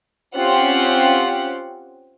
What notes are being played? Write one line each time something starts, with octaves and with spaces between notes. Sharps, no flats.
C4 C#4 F4 G4 F#5